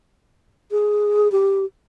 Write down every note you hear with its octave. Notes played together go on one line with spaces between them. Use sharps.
G#4
G4